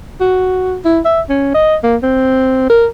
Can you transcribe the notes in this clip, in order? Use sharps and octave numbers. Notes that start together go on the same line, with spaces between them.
F#4
E4
E5
C#4
D#5
A#3
C4
A#4